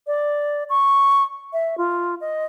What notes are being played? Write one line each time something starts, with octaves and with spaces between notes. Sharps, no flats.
D5
C#6
E5
F4
D#5